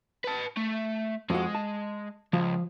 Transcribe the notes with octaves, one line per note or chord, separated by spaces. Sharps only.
B4 A5
A3
F2 G#3 F#4
A5
C#2 F3